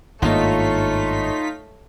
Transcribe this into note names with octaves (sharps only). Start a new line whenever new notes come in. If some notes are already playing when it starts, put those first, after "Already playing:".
G#1 G2 A3 A#3 D#4 F4 C#5 B6